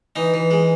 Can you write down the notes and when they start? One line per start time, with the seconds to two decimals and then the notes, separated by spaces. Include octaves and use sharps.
0.16 E3 D#4
0.34 E3
0.51 G#3